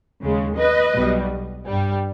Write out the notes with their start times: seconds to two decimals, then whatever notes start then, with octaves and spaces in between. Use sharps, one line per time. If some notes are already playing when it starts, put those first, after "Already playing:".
0.22 D#2 C#3 G#3
0.58 B4 D#5
0.95 B1 B2 G3
1.67 G2 G3